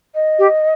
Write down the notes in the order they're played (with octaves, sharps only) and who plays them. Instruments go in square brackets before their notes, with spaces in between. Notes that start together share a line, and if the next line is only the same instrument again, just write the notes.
[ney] D#5
[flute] G4